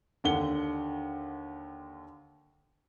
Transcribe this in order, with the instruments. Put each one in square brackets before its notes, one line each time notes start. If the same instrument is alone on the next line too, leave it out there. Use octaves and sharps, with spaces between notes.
[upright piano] D#2 D3 F#5 G7